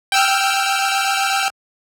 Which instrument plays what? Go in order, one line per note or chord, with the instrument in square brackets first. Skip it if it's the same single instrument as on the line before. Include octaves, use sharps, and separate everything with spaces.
[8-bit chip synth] G5 E6 F6